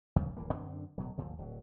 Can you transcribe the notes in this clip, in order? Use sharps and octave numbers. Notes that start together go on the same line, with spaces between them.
D#2 C#3
D1 E3 A#3
F#2 D3 C4 D4
D1 B2 F#3
G1 D2 A#2 F3
D1 F3 F#3